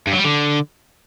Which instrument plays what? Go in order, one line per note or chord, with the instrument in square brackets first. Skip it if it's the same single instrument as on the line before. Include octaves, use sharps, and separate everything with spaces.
[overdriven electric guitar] G2
F#3
G3
D3